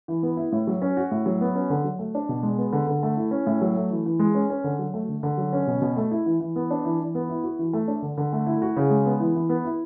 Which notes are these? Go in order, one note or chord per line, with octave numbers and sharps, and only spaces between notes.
E3
B3
E4
A2
F#3
C#4
F#4
A2
F#3
B3
C#4
D3
F#3
A3
D4
B2
G#3
B3
D3
D3
A3
E4
C#4
A2
F#3
A3
E3
E3
G#3
C#4
C#4
D3
F#3
A3
D3
D3
F#3
C#4
B2
B2
A3
E4
E3
E3
B3
D4
E3
E3
B3
E4
F#4
E3
A3
D4
D3
D3
A3
E4
F#4
C#3
G#3
B3
E3
E3
B3
E4